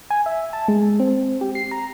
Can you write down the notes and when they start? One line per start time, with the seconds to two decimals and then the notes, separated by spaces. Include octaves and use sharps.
0.10 G#5
0.26 E5
0.53 A5
0.68 G#3
1.00 C4
1.41 G4
1.55 C7
1.71 A#5